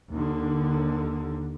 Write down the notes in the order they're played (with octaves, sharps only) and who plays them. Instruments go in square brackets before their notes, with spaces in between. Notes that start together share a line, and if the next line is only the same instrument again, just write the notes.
[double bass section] D#2 D3